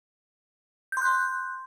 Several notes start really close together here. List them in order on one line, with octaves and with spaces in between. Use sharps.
G6 C6 F#6